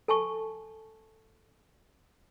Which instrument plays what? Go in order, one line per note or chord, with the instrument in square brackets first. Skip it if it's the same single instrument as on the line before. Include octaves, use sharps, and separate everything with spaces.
[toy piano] A4 G#5 A5 C#6